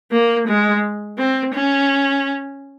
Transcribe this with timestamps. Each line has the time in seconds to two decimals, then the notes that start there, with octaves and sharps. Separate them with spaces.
0.12 A#3
0.47 G#3
1.18 C4
1.54 C#4